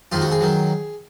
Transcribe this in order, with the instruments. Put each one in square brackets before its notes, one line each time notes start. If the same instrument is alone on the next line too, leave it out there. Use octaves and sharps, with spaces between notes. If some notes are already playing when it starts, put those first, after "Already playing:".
[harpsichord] F2 D#3 G#3 F4
F#4
G#4
D#3 F#3